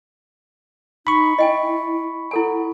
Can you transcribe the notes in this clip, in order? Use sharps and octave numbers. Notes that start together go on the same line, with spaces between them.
D#4 B5 C#6
E4 D#5 G5 G#5
E4 A4 F#5 G#5